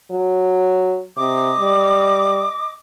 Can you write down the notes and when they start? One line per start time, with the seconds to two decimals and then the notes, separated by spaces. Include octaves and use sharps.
0.11 F#3
1.17 C3 D#5 D6 D#6
1.59 G3